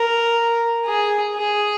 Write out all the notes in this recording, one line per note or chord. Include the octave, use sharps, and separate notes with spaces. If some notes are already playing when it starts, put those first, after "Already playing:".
Already playing: A#4
G#4
G#4